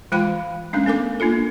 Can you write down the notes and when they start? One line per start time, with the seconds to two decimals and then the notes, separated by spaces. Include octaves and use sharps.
0.12 E3 G#3 F4 F5 G5 B5
0.73 G#3 A3 C#4 D4
0.86 B3 A4 A#4 D6
1.20 A#3 D4 F4 A4